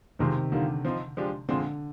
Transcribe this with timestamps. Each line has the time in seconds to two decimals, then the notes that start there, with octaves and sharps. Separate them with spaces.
0.19 C3 D#3 F3 G#3 C4
0.52 D3 D#3 G3 A#3 F4
0.85 F3 C4 D#4
1.17 F3 G#3 D4 G4
1.49 A#2 D3 F3 G#3 C4